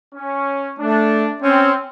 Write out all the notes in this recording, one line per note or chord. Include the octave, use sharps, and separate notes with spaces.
C#4
A3 D4
C4 C#4